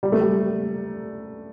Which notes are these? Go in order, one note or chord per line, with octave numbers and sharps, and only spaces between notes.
G3
A3
G3